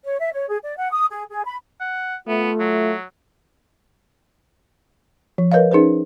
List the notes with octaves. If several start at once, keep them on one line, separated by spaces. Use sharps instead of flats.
C#5
E5
C#5
G#4
D5
F#5
D#6
G#4
G#4
B5
F#5
A3 B3 F4
F#3
F3
A#4 B4 C#5 D#5 F5
C#4 D#4 G#4 B4 C5